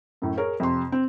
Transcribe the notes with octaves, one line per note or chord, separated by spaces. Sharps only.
F#2 A2
G#4 A#4 C#5
F2 C3 C6
C4